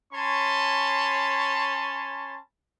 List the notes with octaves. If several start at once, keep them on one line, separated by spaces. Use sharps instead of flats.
C#4 C#5 G#5 A5 B5 C6